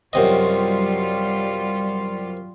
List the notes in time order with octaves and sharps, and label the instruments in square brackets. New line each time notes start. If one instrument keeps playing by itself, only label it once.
[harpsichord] F#2 C3 D#5 [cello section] F#3 G3 F4